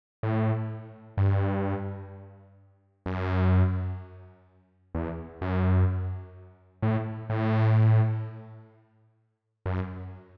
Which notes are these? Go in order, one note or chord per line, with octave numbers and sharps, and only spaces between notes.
A2
G2
F#2
E2
F#2
A2
A2
F#2